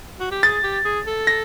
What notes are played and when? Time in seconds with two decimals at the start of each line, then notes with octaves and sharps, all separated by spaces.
0.20 F#4
0.31 G4
0.43 G#4 A6
0.64 G4
0.85 G#4
1.07 A4
1.27 A#6